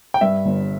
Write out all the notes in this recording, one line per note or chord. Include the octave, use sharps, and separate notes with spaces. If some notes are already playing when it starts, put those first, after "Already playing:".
G5
G2 E5
G1